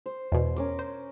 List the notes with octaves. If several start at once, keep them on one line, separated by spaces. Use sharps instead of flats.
C5
E2 B2
C#4 A#4 D6
C5